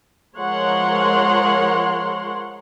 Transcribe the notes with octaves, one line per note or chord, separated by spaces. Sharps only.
F3 G#3 A#4 C#5 F#5 C6